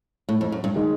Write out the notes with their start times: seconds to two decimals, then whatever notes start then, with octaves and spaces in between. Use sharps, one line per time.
0.29 A2
0.41 F2
0.52 F#2
0.64 G2
0.76 D#3 G#3